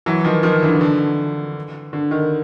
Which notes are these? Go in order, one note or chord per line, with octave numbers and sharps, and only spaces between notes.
E3 F#3
D#3 F3
D#3 F3
D3 E3
D3
D3
D#3